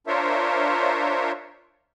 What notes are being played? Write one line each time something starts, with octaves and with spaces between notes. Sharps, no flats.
D4 F4 A#4 C5 C#5 E5